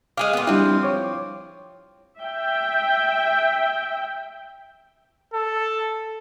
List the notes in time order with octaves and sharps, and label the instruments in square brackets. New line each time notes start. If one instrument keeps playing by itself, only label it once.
[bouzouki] G#3 G#4 F5 [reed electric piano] D6 D#6
[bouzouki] A#2 B3
[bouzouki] F3 C4 [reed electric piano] G3 D4 E4
[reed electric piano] C#5 D6
[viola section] E5 G5
[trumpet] A4